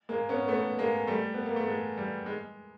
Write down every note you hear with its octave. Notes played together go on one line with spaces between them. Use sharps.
G#3 A#3
B3 C#4
A3 B3
G#3 A#3
G3 A3
B3
A#3
A3
G#3
G3
G#3